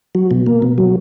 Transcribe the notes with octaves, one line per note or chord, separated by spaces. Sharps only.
F#3
B2
A#3
B2
F#3